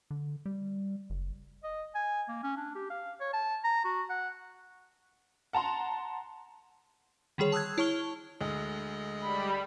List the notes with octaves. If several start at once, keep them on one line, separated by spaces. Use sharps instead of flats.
D3
G3
F#1
D#5
G#5
A#3
C#4
D4
G4
F5
C#5
A5
A#5
F#4
F#5
F#5 A5 A#5 C6
D3 D#3 G3 G#4 C#5
A5 D#6 E6 F#6 G#6
E4 C#5 A5 C#6 F6 G7
D2 G#3 D#5
G3 B5